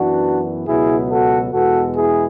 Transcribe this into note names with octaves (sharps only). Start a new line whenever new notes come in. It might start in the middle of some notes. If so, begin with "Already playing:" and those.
Already playing: F#2 E3 B3 D4 F#4
C#2 B2 F#3 B3 E4 G#4
F#4 A4
E2 B2 G#3 B3 F#4 A4
E4 G#4